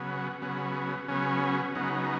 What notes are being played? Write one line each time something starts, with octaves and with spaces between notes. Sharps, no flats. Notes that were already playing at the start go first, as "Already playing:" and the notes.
Already playing: C#3 F#3 B3
C#3 F#3 B3
C#3 F#3 B3 C#4
C#3 F#3 B3 D#4